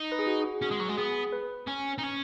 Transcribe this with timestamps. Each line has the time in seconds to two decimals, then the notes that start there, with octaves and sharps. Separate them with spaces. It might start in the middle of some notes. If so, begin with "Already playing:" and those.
Already playing: D#4
0.12 B4
0.19 G#4
0.27 F#4
0.44 G#4
0.62 C#4 F#4
0.71 G#3
0.80 F#3
0.89 G#3
0.97 B3 G#4
1.32 B4
1.67 C#4
1.98 D#4
2.03 C#4